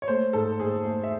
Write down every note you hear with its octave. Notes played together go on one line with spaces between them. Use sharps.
C#5
A3 C5
G#2 A4
G#2 G#4
A3
E5